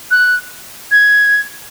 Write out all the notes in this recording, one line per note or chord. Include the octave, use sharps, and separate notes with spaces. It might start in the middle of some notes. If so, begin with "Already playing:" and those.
F#6
G#6